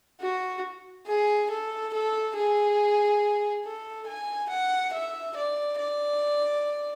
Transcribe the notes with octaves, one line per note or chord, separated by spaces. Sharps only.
F#4
G#4
A4
A4
G#4
A4
G#5
F#5
E5
D5
D5